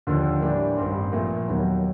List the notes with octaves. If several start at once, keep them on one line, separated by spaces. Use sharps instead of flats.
D#2 D3 F3
A2 E3 G3 A#3 D4
A1 G2 D#3 G3 C4
A#2 F3 A3
D#2 D#3 F#3 B3